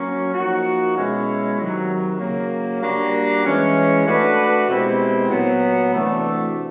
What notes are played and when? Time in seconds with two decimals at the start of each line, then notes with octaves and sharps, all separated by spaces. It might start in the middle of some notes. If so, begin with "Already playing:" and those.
Already playing: F#3 A#3 C#4
0.33 F3 A#3 D#4 F#4
0.96 B2 G#3 C#4 E4
1.59 C3 D#3 F#3
2.20 C#3 F#3 A#3
2.82 G3 A#3 D4 F#4
3.45 E3 G#3 C#4
4.06 A3 D4 F#4 B4
4.68 B2 G#3 C4 E4 G4
5.30 A#2 F#3 B3
5.92 C3 E3 A3 D4 F#4